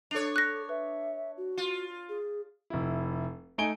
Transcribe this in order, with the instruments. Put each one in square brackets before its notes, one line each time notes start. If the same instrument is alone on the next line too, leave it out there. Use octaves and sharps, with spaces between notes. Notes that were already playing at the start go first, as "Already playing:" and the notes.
[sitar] D4 C#5 [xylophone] A4 F7
[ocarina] A4 [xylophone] F#6 A#6
[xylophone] B4 [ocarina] E5
[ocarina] F#4
[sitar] F4
[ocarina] G#4
[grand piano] F1 E4
A3 D#4 G#5 D7 G7